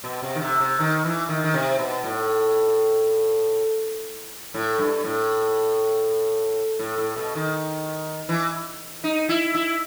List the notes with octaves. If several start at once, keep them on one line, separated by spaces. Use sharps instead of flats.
B2
C3
D#3
C3
C3
D#3
E3
D#3
D#3
C3
B2
A2
A2
G2
A2
A2
A2
B2
D#3
E3
D#4
E4
E4